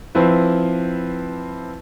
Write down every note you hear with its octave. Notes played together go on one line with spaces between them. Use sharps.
F3 C4 E4 B4